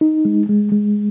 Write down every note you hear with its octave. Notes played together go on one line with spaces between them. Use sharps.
D#4
G#3
G#3
G#3